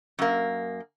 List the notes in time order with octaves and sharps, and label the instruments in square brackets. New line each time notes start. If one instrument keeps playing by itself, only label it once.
[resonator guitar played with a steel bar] F#2 A#3